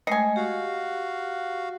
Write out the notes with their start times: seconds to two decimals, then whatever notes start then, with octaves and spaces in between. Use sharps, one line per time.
0.07 G#3 A3 D#5 G#5
0.36 F#4 G4 F5